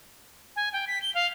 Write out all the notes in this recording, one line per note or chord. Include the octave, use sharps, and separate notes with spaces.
G#5
G5
B6
G7
F5